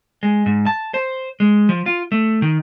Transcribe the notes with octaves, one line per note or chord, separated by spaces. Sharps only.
G#3
G#2
A5
C5
G#3
F3
F4
A3
D#3